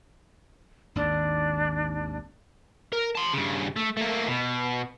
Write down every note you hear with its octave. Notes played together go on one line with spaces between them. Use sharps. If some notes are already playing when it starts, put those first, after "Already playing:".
G#1 D#2 D4
A#4
A5 C6
G2 C#3
A3
A3 A#3
B2